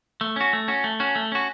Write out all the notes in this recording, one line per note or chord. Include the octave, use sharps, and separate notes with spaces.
A3
C#4 F#4
A3
C#4 F#4
A3
C#4 F#4
A3
C#4 F#4